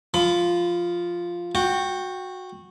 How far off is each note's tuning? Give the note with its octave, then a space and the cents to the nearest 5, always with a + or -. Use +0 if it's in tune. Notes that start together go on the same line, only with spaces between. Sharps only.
F3 +0 B5 +30
F#4 -15 G5 +5